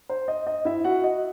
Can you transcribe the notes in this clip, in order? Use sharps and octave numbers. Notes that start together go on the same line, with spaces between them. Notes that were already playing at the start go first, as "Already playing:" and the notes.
C5
D#5
D#5
E4 E5
F#4 F#5
D#5